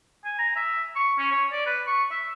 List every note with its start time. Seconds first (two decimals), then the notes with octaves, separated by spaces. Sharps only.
0.25 G#5
0.39 A#5
0.56 E5
0.96 C#6
1.18 C#4
1.31 C#5
1.52 D5
1.66 B4
1.87 C#6
2.11 E5